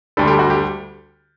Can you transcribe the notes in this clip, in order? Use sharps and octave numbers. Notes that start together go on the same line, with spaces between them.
D2 D3 G3 A4
G4
F#4
G4